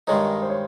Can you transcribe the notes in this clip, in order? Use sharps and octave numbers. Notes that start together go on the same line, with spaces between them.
G2 D#3 G#3 D#4 A#4 C#5
C5
C#5